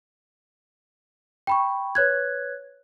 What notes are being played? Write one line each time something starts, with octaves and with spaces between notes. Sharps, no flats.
G5 B5 C#6
B4 C#5 F#6 G#6